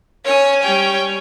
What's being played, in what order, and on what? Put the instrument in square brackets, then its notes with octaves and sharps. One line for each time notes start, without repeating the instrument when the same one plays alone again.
[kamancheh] C#4 G#5 [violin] C#5
[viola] G3 C#5 [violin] G5